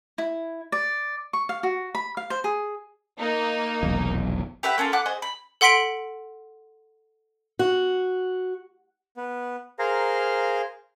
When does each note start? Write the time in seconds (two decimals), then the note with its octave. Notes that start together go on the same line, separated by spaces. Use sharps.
0.18 E4
0.72 D5
1.33 C#6
1.49 F5
1.63 F#4
1.95 B5
2.17 F5
2.30 C5
2.44 G#4
3.19 A#3 D#4
3.83 F1 B1 E2
4.63 G4 B4 E5 F#5
4.78 A#3 C#4 F4 A4
4.93 B4 F#5 D6 F#6
5.06 G#4 C5 D#5
5.22 B5
5.61 A4 F#5 C6 B6 D7 F#7
7.59 F#4
9.17 B3
9.79 G#4 A#4 C5 F5 A#5